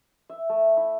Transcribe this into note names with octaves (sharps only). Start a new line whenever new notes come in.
E5
A3
E4